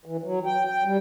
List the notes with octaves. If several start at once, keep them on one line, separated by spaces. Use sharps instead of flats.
E3
F#3
G5
G5
G3